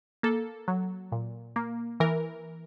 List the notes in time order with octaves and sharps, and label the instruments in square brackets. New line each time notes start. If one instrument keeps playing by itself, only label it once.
[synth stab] A#3 A4
F#3
A#2
A#3
E3 A#4